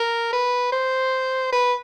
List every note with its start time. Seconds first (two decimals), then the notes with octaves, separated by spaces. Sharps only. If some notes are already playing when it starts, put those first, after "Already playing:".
Already playing: A#4
0.33 B4
0.72 C5
1.53 B4